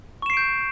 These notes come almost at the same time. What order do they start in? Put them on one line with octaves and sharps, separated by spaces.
C#6 E7 C7 D7 G6